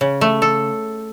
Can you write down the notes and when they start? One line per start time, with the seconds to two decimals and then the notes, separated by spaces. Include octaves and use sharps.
0.01 C#3
0.21 A3
0.42 A4